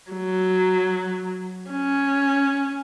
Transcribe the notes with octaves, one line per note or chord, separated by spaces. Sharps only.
F#3
C#4